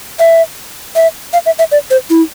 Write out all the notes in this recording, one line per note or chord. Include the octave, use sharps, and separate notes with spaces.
E5
E5
F5
E5
E5
D5
C5
E4